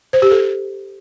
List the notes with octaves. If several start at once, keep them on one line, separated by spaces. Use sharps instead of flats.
C5
G4
A4